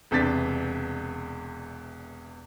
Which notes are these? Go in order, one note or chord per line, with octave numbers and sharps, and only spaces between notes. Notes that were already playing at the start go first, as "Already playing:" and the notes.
E1 E2 C3 D4 A6 B6